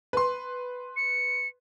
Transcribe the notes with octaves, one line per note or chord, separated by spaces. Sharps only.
B4 C6
C#7